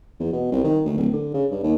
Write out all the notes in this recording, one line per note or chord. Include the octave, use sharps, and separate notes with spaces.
E2
B2
C2
D#3
D2
D1
D3
C#3
G2
D#2